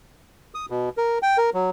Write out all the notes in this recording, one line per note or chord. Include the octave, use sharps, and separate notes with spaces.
D#6
B2
A#4
G5
A#4
F#3